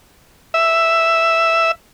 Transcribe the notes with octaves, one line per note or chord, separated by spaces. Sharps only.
E5